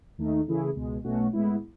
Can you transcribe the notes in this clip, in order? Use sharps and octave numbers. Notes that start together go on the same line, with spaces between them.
D#2 D#3 A3 D#4
C#3 E3 A3 E4 G#4
C#2 B2 G#3
B1 B2 A3 C#4 F#4
A2 G#3 B3 E4